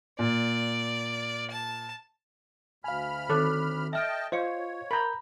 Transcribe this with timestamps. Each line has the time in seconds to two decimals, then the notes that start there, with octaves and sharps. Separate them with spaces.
0.19 A#2 D5
1.51 A5
2.84 D2 F5 G#5 B5 F6
3.30 D#3 C4 A4 C#5 D6 F#6
3.93 D#5 E5 G5 A5 F6 D7
4.32 F4 C5 C#5 D#5 F5 C#7
4.91 A#4 A#5 B5 G6